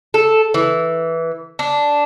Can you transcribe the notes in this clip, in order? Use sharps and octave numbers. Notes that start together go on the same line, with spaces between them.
A4
E3
D4